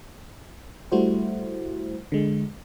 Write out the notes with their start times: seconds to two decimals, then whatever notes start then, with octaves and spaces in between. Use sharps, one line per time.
0.92 G3 A3 E4 F#4 C5
2.12 D3 G#3